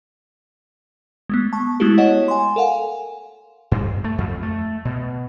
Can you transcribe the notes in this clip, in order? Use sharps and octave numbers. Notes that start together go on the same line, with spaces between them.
G#3 A3 B3
A5 C#6
G#3 A3 B3 E4 F#4 G4
C#5 D#5 F#5 E7
G#5 C6
A4 A#4 F5 F#5 G#5
G2
A3
F2
A3
B2